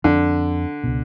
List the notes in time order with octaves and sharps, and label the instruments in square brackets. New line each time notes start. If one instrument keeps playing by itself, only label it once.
[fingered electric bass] F2 F3 C4 [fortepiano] D3
[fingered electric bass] C#2 B2